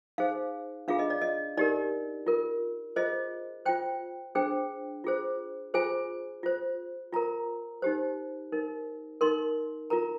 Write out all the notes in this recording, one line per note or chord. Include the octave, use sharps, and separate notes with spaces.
D#4 G#4 C5 F5
D4 F4 G#4 F5
D#5
D5
D#5
D#4 G4 A#4 D5
F4 A#4
F4 G#4 C5 D#5
F4 C5 G5
D4 G#4 C5 G5
F4 G#4 C5
F4 G#4 C5 G#5
F4 C5
F4 A#4 A#5
D#4 G4 C5
D#4 A#4
D#4 A#4 C6
F4 A#4 A#5